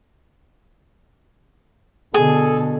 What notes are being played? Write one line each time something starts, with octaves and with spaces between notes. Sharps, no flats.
B2 D3 G#4 A4